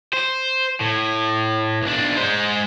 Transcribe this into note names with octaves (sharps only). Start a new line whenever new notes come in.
C5
A2
B1 D4
G#3 C5